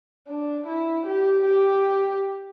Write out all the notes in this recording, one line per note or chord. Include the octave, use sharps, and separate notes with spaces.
D4
E4
G4
G4